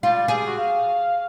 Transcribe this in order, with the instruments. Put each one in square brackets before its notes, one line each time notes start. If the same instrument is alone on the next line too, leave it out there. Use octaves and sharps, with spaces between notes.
[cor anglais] G3 [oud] F4
[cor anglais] G4 [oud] G#4
[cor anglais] F#4
F5